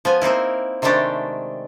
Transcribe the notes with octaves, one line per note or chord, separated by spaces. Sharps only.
F3 B3 G#5
A#3 C4 D#4 E4
C3 D#3 G#3 A3 D4 G4